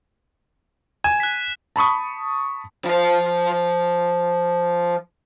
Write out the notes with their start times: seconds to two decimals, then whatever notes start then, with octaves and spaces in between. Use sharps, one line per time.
1.04 G#5 E7
1.20 F#6 B6
1.76 A5 B5 C#6 D#6
2.85 F3 C5